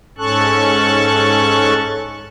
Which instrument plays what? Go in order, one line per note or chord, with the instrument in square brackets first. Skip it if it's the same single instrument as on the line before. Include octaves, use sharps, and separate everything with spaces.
[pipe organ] G#2 C#4 A4 A5 C#6 F#6